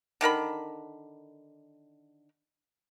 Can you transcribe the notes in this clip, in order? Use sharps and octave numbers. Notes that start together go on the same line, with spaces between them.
D3 D#3 A#4 B5